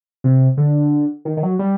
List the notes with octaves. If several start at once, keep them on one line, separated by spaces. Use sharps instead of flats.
C3
D3
D#3
D#3
F#3
G3